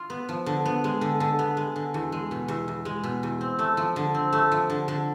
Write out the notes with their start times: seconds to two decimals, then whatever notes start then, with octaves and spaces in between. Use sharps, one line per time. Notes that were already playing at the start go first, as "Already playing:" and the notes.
Already playing: F4
0.10 B3
0.29 F3
0.46 D3
0.66 B3
0.84 G#3
1.01 D3
1.20 D3
1.39 B3
1.57 G#3
1.76 D3
1.94 E2
2.12 G#3
2.31 B2
2.48 E2
2.68 E2
2.85 G#3
3.04 B2
3.23 E2
3.41 C4
3.59 A3
3.77 F3
3.96 D3
4.15 C4
4.33 A3
4.52 F3
4.70 D3
4.88 D3